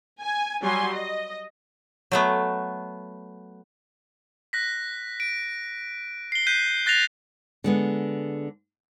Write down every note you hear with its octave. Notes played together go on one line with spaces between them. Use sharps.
G#5
F#3 G3 G#5 C6
D#5
F#3 A3 B3
F#6 A#6 B6
D7
C7 G7
F#6 G6 B6 C7 D#7
F#6 A6 A#6 C7 F7
D3 G#3 B3